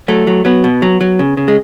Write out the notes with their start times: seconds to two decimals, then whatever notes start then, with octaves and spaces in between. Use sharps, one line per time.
0.08 F#3 A3
0.27 F#3
0.45 F#3 B3
0.64 B2
0.82 F#3
1.01 F#3
1.19 C#3
1.37 C#3
1.48 G#3